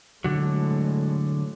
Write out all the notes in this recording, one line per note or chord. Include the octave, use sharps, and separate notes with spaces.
A2 D3 F#3 G#3